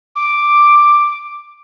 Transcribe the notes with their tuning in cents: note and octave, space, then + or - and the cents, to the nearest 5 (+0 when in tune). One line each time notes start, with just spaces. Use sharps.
D6 +5